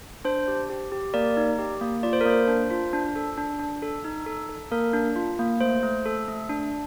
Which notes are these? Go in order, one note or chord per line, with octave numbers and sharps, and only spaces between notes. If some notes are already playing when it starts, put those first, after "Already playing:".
D4 C5
G4
G4
G4
A#3 A#4 D5
D#4
G4
A#3
F4 D5
C5
A#4
A#3 C5
D4
F4
D4
A4
D4
D4
A4
D#4
A4
A4
A#3 A#4
D4
F4
A#3
A3 C5
A3
A4
A3
D4